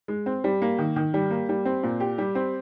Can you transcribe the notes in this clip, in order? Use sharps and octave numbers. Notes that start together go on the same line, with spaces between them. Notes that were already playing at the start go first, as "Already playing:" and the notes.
G#3
C4
G3
A#3
D#3
D#3
G3
A#3
G3
C4
A#2
G4
G3
C4